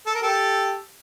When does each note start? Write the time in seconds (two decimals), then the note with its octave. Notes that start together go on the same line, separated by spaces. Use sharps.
0.06 A4
0.15 A#4
0.21 G4 A4